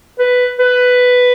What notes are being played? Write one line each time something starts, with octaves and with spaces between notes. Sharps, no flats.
B4
B4